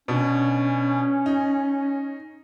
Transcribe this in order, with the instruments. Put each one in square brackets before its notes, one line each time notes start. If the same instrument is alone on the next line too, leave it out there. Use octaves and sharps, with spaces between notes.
[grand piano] B2 D4 [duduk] C#4
[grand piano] D#4